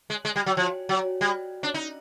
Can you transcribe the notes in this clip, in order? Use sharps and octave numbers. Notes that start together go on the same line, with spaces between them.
G#3
G#3
G3
F#3
F3
F#3
G3
D4
D#4